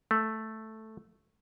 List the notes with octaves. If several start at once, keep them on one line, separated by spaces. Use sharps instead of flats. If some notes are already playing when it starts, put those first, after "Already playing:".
A3